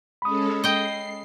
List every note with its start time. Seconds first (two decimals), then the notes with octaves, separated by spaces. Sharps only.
0.22 G#3 C#4 A4 B5 D#6
0.64 D#5 G5 C7